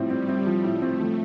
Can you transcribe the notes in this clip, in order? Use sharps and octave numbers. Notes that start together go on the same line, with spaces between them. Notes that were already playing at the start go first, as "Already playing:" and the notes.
Already playing: A2 F3 G3 C4
C4
C4
F3
A2 A3
C4
F3